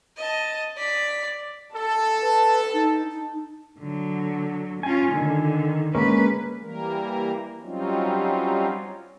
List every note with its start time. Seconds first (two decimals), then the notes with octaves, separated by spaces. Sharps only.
0.17 D#5 A5
0.77 D5 B6
1.75 A4 A5
2.22 B4
2.73 D#4
3.10 D#4
3.79 D3 F#3
4.83 C#4 F4 G#5
5.12 D3 D#3
5.95 G#3 A#3 C#4 B4
6.61 E3 G3 A#3 A#4
7.63 F#3 G3 C4 C#4 D#4 F4